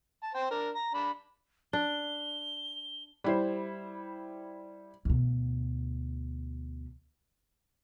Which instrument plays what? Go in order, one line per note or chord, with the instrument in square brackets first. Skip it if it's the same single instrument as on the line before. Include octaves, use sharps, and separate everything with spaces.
[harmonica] A5
C5 G5
D4 A#4
A#5
D4 B5
[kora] D4 [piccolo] G7
[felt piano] G3 E4 C5
[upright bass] D2 B2